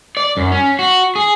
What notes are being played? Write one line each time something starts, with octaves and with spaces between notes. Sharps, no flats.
D5
F#2
C#4
F#4
G#4